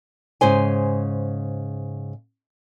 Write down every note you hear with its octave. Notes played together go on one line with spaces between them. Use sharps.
G#2 C#3 C5 G#5